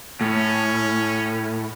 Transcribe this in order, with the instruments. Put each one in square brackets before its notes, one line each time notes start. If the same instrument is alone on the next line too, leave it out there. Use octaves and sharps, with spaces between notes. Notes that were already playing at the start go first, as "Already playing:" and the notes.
[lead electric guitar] A2 [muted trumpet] C#4